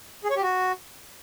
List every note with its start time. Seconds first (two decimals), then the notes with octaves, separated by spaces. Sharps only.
0.24 G#4
0.30 C#5
0.36 G4
0.42 F#4